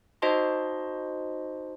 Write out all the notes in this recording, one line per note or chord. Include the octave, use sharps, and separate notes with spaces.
D#4 F#4 C5 D#5 A5 C6